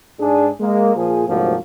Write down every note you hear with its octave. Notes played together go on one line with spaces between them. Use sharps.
G#2 D4 G#4
G#3 A#3
A#2 F3 G#4
D2 G#2 C3 F3 F#3 A#3